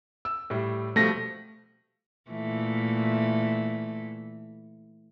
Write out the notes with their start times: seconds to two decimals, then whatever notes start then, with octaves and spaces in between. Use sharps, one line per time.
0.25 E6
0.50 A2 G3
0.96 B2 F3 G3 A3 A#6
2.30 A#2 E3 A3